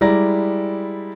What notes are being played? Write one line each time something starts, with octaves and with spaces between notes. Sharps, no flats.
G3 G#3 E4 D5 A#5 A#6